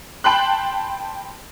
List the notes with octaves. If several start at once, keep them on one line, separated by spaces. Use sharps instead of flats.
G5 A5 B5 C6 F#6